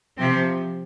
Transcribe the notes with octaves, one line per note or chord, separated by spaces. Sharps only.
C3 F3 C4